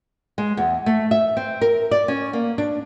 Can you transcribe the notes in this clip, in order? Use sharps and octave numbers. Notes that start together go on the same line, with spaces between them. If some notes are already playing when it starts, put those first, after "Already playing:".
G#3
E2
A3
E5
C4
A#4
D5
C#4
A#3
D4